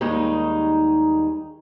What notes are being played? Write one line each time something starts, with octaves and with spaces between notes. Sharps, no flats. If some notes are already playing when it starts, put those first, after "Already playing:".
D#2 D#3 G3 G#3 D#4